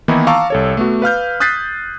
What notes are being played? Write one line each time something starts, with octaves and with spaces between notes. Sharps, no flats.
D#3 E3 A#3 B3 D#4 E4
F5 A5 A#5 C#6 D6 E6
C2 A4 C#5
A3 B3 F#4
B4 F5 F6 G6
D#6 F#6 G6 A6 B6 C7